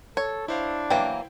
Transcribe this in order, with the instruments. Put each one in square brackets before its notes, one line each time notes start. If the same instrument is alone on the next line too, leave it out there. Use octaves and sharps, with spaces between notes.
[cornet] A4 [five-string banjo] C#5
[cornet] D4 [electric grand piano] E4 C5 F5
[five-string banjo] E3 F#3 A#3 [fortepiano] G5